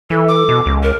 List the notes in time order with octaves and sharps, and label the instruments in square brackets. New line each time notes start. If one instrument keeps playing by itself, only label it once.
[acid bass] E3 [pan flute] A4
[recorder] D6
[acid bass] B2
C#2
[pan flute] A#4